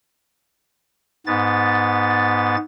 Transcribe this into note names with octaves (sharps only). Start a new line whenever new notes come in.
G#2 B3 A6